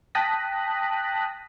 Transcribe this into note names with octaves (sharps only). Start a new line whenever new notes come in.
G5 A5 D#6 F#6 A#6 B6